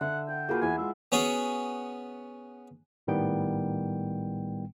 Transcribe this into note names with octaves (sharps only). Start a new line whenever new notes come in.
D3 E5 F#5
F#5 G5
A#3 F4 F#4 G#4 B4
E2 E4 F#5 G#5
G#3 F4 E5
B3 C#4 F#4 G#4
G#1 A2 D#3 G3 B3 G5